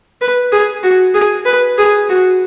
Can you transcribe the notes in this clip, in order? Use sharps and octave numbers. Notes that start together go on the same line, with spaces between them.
B4
G#4
F#4
G#4
B4
G#4
F#4